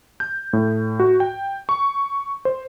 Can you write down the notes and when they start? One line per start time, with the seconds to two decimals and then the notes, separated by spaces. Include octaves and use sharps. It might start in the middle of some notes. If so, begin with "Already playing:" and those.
0.20 G6
0.53 A2
1.00 F#4
1.20 G5
1.69 C#6
2.45 C5